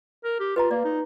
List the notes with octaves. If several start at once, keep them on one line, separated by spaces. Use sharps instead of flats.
A#4
G4
F4 B4 D#5 A#5
A#3 D5
D#4